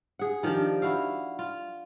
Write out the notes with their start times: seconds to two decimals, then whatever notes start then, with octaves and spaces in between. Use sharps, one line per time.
0.19 G#4 F#5
0.43 D#3 F3 D4 G4
0.82 E4 F#4 F5
1.39 F4